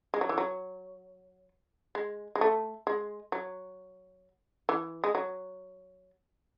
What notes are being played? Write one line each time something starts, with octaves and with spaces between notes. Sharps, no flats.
G#3
F#3
E3
F#3
G#3
G#3
A3
G#3
F#3
E3
G#3
F#3